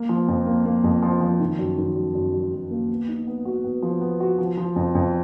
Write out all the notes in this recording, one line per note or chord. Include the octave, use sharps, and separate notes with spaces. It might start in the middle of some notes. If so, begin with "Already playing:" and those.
Already playing: A#3
F3
F2
A#3
A#3
F2
F3
F3
D#3
F#2
D#3
F#2
F#2
F#2
F#2
A#3
B3
D#4
B3
F#4
B3
F3
B3
F#4
F3
F3
F2
F2